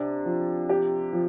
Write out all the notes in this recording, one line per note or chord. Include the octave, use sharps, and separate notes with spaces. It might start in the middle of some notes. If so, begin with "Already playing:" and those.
Already playing: C3 D4
F3
G4
F3